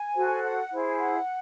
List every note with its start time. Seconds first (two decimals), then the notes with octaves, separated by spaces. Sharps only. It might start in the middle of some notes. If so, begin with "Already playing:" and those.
Already playing: G#5
0.14 F#4 A4 C5
0.42 F#5
0.71 E4 G#4 C5
0.99 F#5